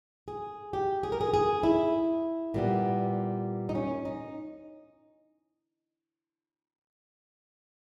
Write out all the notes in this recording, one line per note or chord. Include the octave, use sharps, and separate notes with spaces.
G#4
G4
G#4
A#4
G#4
G#4
E4
A#2 G3 B3
D#4
C#4
D#4